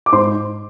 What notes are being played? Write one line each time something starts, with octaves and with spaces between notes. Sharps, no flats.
D6
G#2 C5 C6